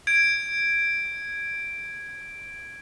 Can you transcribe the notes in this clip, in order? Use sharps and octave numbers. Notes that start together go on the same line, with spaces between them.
G#6 D7